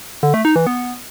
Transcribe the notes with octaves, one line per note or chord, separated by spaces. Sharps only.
D3
A3
D#4
E3
B3